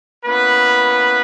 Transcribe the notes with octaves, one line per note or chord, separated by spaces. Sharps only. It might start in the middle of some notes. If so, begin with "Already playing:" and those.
A#3 B3 C#4 E4 B4